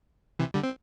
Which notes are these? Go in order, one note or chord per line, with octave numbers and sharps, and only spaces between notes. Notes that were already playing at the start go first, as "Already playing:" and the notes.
C3 E3
D3 G3
C4